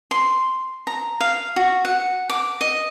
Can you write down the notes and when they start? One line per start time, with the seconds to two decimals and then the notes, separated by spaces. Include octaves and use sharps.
0.11 C6
0.87 A#5
1.21 F5
1.56 F#4
1.85 F#5
2.30 D6
2.61 D#5